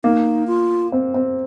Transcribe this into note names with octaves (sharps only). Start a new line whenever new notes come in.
A#3 D#4
F4
C4
C4